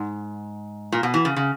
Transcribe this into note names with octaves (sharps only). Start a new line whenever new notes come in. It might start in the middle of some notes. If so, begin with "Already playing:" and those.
Already playing: G#2
A#2
B2
E3
C#3
C#3